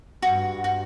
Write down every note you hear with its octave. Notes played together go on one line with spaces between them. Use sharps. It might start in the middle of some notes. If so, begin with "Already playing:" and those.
G2 F#4
F#4